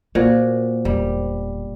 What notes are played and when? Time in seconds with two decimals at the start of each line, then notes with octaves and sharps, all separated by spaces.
0.15 A#2 A#3 F#4 A#4 C5
0.85 E1 G3